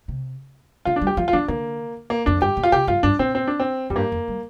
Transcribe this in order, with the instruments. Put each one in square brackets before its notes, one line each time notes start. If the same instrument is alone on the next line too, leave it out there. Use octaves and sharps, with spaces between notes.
[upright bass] C3
[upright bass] D3 [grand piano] F4
[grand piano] D4
[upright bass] G3
[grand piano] G4
[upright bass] F3 [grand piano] F4
[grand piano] F4
[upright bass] F3 [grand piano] D4
[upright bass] D3 [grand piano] A#3
[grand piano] A#3
[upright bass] F2 [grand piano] D4
[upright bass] G2 [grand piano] G4
[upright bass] A#2
[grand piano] F4
[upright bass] C3 [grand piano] G4
[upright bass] G2 [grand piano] F4
[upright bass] G2 [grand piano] D4
[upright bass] A#2 [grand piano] C4
[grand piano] C4
D4
C4
[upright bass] F2 [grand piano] G3
[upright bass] G2 [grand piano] A#3
[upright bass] F2
G3